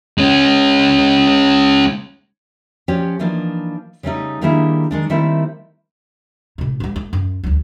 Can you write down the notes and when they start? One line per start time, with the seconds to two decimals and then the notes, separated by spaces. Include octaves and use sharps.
0.18 G#3 C#4
2.88 F3 C#4 G4 C#5 D5
3.19 E3 F3 A#3 D4 D#4
4.03 C#3 G3 A3 D#4
4.41 D#3 G3 A#3 D4 E4 G#4
4.91 D#3 G#3 D4
5.10 D#3 G3 A3 A#3 C4 E4
6.58 A2 C3
6.80 E3 G3
6.96 A3
7.13 F#2
7.44 D2 F#3